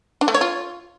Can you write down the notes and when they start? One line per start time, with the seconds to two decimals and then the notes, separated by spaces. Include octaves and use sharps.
0.21 D4
0.28 A3
0.34 C#5
0.41 F4